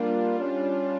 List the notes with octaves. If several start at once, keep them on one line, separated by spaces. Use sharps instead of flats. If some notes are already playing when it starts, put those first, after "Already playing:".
Already playing: G3 A#3 D4 F4
C#4